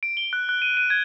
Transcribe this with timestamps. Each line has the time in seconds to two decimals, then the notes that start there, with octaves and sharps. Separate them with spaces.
0.03 D7
0.17 G7
0.33 F#6
0.49 F#6
0.62 D#7
0.77 D#7
0.90 G#6